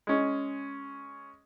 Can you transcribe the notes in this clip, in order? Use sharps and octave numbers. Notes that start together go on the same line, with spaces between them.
G#3 C#4